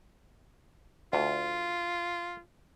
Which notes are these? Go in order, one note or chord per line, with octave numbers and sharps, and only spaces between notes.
D2 F4